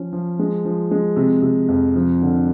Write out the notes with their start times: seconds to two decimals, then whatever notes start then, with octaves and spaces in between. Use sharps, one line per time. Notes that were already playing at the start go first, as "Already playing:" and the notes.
Already playing: F3 C#4
0.13 F3
0.39 G#3
0.65 F3
0.91 G#3
1.16 C3
1.42 C3
1.69 F2
1.95 F3
2.22 D3